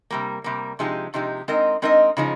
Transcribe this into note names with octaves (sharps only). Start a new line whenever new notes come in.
C3 G3 A#3
C3 G3 A#3
C3 F3 G#3 D#4 G4
C3 F3 G#3 D#4 G4
G#3 C4 D#4 A#4 D#5
G#3 C4 D#4 A#4 D#5
C#3 F3 G#3 D#4